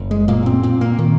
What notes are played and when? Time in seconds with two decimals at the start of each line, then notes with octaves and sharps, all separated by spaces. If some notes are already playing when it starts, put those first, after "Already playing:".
Already playing: F#1
0.11 G#3
0.28 A#2 A#3
0.46 C4
0.63 A#2 C4
0.81 A#3
0.98 A#2 D#3